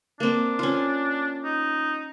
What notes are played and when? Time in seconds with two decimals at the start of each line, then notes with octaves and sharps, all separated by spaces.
0.20 A#3 C4 D4
0.59 C#4 F4
1.44 D#4